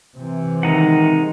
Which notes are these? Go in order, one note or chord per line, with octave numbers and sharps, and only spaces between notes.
C3 E3
D#3 G#3 D#4 F#5